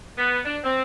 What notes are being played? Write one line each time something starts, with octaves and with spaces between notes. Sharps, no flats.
B3
D4
C4